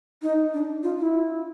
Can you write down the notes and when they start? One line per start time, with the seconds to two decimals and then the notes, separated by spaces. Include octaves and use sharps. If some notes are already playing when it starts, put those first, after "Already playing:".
0.22 D#4
0.53 D4
0.83 F4
0.99 E4